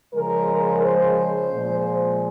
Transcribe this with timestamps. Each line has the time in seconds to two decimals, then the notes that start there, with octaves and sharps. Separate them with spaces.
0.14 C#3 F3 G#3 A#4
0.83 C5
1.52 A#2 F3 G#3